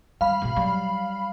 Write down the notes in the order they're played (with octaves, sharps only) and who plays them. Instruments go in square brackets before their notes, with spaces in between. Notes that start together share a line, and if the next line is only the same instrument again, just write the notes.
[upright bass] D#3 G3 [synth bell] F5 B5
[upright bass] B2 B3
F#3 G3